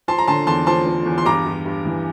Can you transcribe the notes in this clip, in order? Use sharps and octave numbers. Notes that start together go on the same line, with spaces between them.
F3 A5 C6
A#5
D3 A5 C6
E2 A5 C6
F3 A5 C6
F3
E2
C6
G2 A#5 D6
G2
G2
E3